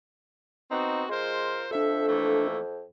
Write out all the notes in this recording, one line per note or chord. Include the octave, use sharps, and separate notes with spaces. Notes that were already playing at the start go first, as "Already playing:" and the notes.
B3 C4 D#4 F#4
G#3 F4 A#4 C5
F2 D4 A4 E5
E3 A3 A#3